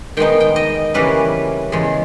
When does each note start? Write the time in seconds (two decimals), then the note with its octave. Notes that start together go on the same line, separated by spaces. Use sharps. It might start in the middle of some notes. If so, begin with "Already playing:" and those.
0.17 D#3 G#3 B3 D#4 G5
0.40 G5
0.56 D#5
0.94 C#3 E3 G3 A#3 C#4 B4
1.72 E2 C#3 G#3